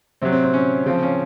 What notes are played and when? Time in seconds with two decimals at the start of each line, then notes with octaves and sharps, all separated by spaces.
0.22 C3 F#3 C4
0.32 C4
0.44 C4
0.54 C#4
0.86 C#3 F3 C4
1.03 C#4